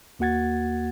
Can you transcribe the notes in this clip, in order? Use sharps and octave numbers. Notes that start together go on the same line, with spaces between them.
D#2 A#3 F#4 F#5 G#6 A6